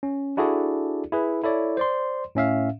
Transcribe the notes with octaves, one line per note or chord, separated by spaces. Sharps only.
C#4
D4 E4 F#4 G#4 A4 D5
E4 G#4 B4
E4 A4 C#5 D5
C5 D5 C6
A2 C#4 E5 F5